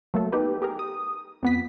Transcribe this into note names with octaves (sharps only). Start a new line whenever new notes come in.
F#3 A3 A#3 A4
B3 D#4 G4 B4
G4 G#4 A#4
D#6
F2 B3 B6